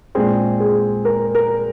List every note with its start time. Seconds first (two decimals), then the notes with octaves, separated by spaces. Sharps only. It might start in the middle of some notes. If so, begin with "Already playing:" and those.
0.15 A#2 G#3 C4 G#4
0.60 G#4
1.05 A#4
1.35 A#4